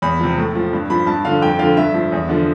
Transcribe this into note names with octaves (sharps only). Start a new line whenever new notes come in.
E2 B5
C3 F3
A2
F3
G2
F3 B5
G2 A5
D3 F3 F5
F2 G5
D3 F3 F5
G2 E5
F3
E2
D3 F3